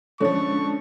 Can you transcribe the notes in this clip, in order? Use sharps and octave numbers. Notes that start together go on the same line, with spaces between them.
D3 F3 G#3 C#4 D4 A4 C#5 C#6